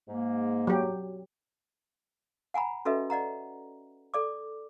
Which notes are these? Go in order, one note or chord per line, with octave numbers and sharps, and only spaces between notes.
G#2 A#3
F#3 G4
F#5 G#5 A#5 B5
C#4 F#4 A4 B4 D#5 E5
D5 D#5 F#5 A#5
A4 D5 D6